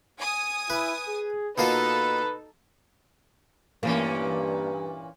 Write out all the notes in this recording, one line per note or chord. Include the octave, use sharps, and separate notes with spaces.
G#5 D#6
E4 B4
G#4
B2 A#3 D#4 F4 A4 B4
G2 A#2 E3 A#3 C#4